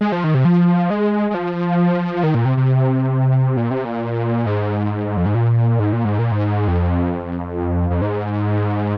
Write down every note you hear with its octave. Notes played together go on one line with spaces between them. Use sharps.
G#3
F3
D#3
C3
F3
G#3
G#3
F3
D#3
A#2
C3
C3
A#2
C3
A#2
G#2
F2
G#2
A#2
G#2
A#2
G#2
A#2
G#2
F2
F2
G#2